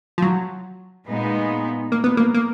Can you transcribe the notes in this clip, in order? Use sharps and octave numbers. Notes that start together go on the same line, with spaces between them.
F3
F#3
A#2 G#3 B3 D#4
A#3
B3
A#3
A#3